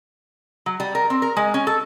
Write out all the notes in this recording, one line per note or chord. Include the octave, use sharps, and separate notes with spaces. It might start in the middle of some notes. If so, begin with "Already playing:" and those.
F#3
G3
A#4
C4
A#4
G#3
C#4
A4